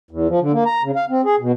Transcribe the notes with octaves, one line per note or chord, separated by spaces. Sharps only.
E2
F3
D3
A#3
A#5
C#3
F5
C4
G#4
B2